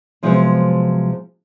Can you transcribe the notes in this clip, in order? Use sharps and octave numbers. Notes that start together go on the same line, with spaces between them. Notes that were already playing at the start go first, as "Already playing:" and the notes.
C3 F3 F#3 G#3 B3 C4